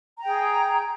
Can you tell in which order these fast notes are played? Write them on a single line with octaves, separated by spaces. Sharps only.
A#5 G5 G#4